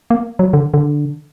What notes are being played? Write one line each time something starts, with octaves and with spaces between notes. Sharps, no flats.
A#3
F#3
D3
D3